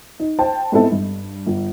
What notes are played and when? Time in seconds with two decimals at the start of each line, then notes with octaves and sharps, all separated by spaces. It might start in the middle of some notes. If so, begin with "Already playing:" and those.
0.20 D#4
0.39 C5 G5 A5
0.72 G#2 B3 C4 E4 A4 E5
0.92 G2
1.46 G1